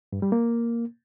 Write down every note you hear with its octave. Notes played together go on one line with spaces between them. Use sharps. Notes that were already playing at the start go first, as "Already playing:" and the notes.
G2
G3
A#3